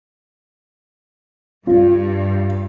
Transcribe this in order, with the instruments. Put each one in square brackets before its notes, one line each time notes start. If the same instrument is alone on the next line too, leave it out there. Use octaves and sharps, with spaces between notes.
[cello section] G2 [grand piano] F4